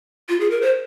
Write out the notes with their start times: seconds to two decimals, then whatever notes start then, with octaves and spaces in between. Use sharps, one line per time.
0.29 F4
0.40 G#4
0.51 A#4
0.62 C5